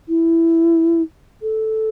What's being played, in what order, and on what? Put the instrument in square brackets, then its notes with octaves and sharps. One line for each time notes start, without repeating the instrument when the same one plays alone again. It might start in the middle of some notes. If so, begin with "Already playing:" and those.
[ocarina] E4
A4